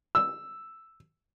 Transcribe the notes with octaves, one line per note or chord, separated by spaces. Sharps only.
E6